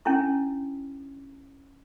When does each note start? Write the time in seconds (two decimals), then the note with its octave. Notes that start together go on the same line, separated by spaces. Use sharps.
0.05 C#4 D4 E4 C#6